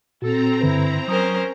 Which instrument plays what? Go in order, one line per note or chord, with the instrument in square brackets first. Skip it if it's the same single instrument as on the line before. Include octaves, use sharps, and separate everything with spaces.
[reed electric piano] A#2 F#4 [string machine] C4 A#5 [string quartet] A4
[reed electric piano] G2 D3 B4 [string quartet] E4
[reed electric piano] F#3 D#6 [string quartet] C#4 A#4 C5